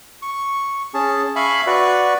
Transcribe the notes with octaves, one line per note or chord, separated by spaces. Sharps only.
C#6
C#4 G#4 A5
E5 F5 G#5 B5 C#6
F#4 B4 D5 C#6